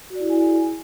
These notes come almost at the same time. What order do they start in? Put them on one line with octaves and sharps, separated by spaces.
F#4 D5 E4 G#4 G#5